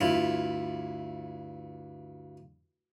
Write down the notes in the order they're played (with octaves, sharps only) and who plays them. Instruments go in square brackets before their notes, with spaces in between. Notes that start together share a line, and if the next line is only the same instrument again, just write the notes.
[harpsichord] D2 G2 E4 F4